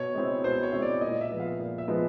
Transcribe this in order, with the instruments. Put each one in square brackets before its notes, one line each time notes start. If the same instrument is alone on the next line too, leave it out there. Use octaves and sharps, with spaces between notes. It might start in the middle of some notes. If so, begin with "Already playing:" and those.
Already playing: [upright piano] B2 [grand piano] C#5
[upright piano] G#3 C4 E4
[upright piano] B2 [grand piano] C5
[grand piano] C#5
[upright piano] G#3 C4 E4
[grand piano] D5
[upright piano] A#2 [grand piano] D#5
[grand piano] E5
[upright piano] F3 G#3 B3
[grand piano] F5
[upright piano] A#2
[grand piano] E5
[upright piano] F3 G#3 B3